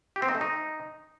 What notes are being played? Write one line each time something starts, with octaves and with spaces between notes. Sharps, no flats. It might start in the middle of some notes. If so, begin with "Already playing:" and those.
G4
C4
D#4
A3
D#4